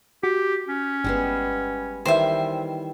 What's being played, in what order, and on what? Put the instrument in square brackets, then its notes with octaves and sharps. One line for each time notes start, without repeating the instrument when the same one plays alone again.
[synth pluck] F#4 [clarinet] G4
[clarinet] C#4
[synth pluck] G1 [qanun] G3 G#3 B3
[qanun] D#3 E3 G3 [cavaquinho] C5 E5